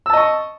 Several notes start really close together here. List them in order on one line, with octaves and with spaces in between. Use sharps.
E6 A5 D#5 C#6